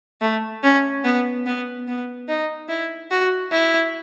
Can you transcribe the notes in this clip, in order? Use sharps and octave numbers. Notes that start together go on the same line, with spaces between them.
A3
C#4
B3
B3
B3
D#4
E4
F#4
E4